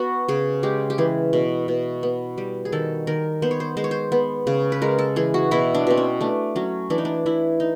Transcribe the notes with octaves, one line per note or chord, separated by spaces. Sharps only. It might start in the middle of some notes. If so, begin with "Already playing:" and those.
Already playing: B3 F#4
C#3 G#4
G#3 G4
G4
E3 G#4
B2
B2
B3
G3
G#4
D#3 A4
D#3 A#4
B3 C5
C#5
C5
G#3 C5
C#5
C5
B3
C#3
B4
G#3 A#4
A4
E3 G#4
F#4
B2 E4
D4
B2 C4
C#4
A3 D4
F#3 C#4
E3 D4
D#4
D4
E3 E4
D#4